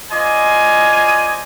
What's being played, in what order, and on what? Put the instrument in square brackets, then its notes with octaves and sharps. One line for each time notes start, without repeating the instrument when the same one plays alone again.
[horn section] F4 C5 D5 D#5 G#5